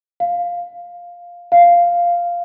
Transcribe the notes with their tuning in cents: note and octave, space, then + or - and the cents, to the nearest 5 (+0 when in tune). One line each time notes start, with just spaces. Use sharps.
F5 +5
F5 -5